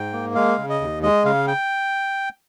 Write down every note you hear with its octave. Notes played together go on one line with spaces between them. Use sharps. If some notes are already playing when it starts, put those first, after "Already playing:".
Already playing: G#2 G5
A#3
G#3 F5
C#3
D#5
D#2
G#3 D#5
C#3 F5
G5